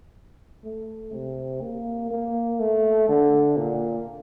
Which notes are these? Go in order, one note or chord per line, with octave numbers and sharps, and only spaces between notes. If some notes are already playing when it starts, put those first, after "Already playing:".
A3
C3
A#3
A#3
A3
D3
A#2